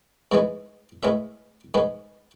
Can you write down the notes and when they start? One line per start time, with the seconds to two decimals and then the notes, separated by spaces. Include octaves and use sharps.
0.32 G#2 E3 G#3 B3
1.03 A2 G#3 B3 E5
1.74 G#2 G#3 B3